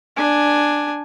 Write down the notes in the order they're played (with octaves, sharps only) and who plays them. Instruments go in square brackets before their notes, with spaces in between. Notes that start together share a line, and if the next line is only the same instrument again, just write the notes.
[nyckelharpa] D4 G#5